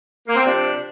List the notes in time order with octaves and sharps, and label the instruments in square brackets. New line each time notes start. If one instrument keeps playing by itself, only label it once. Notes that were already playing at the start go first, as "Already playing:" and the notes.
[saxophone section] A#3
C4
C3 F3 D4